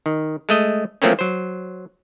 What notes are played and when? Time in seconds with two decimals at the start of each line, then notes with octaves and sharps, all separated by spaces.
0.06 D#3
0.49 G#3 A3 D#5
1.02 F3 F#3 A3 A#3 C4 C#4
1.19 F#3 C5